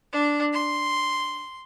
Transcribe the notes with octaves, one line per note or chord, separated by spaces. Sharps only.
D4
C6